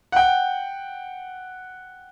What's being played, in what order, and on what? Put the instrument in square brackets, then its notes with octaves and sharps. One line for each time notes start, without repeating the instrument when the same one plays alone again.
[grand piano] F#5 G5